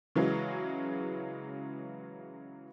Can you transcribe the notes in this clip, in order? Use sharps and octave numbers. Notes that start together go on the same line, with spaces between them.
C#3 E3 F#3 G#3